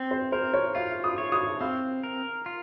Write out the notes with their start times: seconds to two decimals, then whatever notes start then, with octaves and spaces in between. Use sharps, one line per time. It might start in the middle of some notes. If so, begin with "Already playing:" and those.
Already playing: C4
0.11 C5
0.32 A#4 C5
0.54 C#5
0.75 F4 F5
1.04 D#6
1.18 C#5
1.32 D#6
1.61 C4 F5
2.04 A#4
2.46 F4